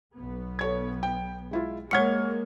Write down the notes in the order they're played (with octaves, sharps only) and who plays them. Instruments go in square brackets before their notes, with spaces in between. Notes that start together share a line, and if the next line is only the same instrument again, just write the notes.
[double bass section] B1 B3
[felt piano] A4 C#5 G#6
G5
G#3 E4 F4
[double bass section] G#3 A#3 [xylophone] C#5 F#5 C#7 [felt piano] C#6 F6 G#6